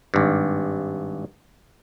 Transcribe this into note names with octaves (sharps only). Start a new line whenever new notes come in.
G#1 G2